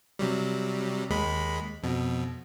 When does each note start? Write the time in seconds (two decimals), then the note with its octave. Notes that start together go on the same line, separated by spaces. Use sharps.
0.19 C3 F#3 G3
1.10 D#2 G#3 B5
1.83 F2 B2